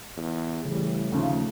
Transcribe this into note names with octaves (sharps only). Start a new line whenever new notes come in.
E2
A2 C#3 E3 G3
D#2 C#3 F3 A3